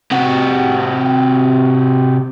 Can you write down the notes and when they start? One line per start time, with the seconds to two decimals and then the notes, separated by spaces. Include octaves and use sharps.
0.12 C3 F#4